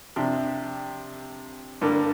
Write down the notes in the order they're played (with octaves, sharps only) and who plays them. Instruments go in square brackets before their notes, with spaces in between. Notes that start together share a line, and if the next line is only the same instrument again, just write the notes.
[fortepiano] C3 F3 D4 G4
G2 D3 A#3